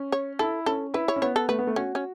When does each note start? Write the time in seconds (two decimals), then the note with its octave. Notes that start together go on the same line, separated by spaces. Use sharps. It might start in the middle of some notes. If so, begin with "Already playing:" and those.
Already playing: C#4
0.12 C#5
0.39 E4 A4
0.66 C#4 A4
0.94 E4 B4
1.08 C#5
1.16 C#4
1.22 B3 C#5
1.36 A4
1.49 A3 B4
1.59 B3
1.67 A3
1.76 C#4 F#4
1.95 C#4